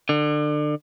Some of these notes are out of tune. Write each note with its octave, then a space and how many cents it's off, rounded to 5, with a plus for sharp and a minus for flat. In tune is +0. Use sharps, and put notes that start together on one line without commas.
D3 +30